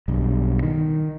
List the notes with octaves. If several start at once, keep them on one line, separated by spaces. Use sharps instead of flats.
B1 G2
D#3